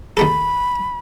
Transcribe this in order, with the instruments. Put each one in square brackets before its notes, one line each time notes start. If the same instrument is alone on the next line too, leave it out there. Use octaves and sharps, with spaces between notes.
[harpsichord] D#2 A3 A4 [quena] B5